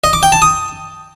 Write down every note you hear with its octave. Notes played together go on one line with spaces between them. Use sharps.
D#5
D6
G5
A5
D#6